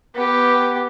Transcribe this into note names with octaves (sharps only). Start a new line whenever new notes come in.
B3 G4